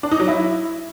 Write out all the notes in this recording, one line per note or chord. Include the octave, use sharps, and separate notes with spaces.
D4
D#4
F#3
E4